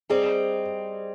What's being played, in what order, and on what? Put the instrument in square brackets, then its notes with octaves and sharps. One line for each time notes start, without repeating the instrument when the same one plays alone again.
[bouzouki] G3 C4 D#4 [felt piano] G#4